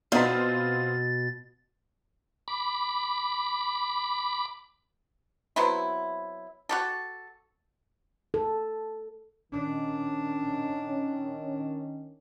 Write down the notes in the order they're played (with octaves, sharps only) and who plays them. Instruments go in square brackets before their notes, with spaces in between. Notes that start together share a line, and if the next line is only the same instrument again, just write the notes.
[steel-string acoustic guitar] B2 [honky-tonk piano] B3 C4 F4 [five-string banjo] D4 D#4 B5 [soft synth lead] A6
[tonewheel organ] B5 D6
[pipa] F#3 B3 C4 E4
F#4 G4 A4
[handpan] A4
[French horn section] D#3 C#4 [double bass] D4